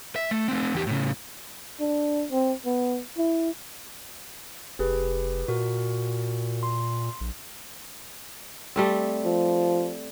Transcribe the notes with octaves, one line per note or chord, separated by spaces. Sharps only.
E5
A3
A3 C4
E2 G4
A2 C#3
D4
C4
B3
E4
F1 G4 G#4 B4
A#2 F#4 A#4
C6
A#1
G3 A3 C4
F3